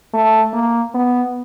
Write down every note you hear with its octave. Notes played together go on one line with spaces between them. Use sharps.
A3
A#3
B3